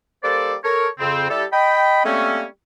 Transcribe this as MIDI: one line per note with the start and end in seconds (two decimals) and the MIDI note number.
0.24 0.56 55
0.24 0.56 58
0.24 0.56 69
0.24 0.56 72
0.24 0.56 74
0.65 0.89 69
0.65 0.89 70
0.65 0.89 73
1.00 1.28 41
1.00 1.28 49
1.00 1.28 60
1.30 1.45 55
1.30 1.45 64
1.30 1.45 67
1.30 1.45 69
1.53 2.04 75
1.53 2.04 79
1.53 2.04 83
2.05 2.45 55
2.05 2.45 57
2.05 2.45 58
2.05 2.45 60
2.05 2.45 61